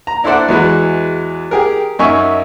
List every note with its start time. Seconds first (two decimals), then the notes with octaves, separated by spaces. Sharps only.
0.07 A#5
0.24 D4 E4 A4 C5 D5 F#5
0.48 E2 E3 G#3 F#4 B4
1.51 G4 G#4 A#4
1.99 F#2 D#4 E5 G#5 C#6